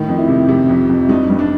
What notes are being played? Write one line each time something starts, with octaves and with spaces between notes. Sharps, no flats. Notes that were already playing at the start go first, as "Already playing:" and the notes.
Already playing: A2 D#3
F2
E4
C3
C3
F2
F2
G2 D#4
G2
D4